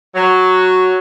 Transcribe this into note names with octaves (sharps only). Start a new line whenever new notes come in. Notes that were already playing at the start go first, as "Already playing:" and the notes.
F#3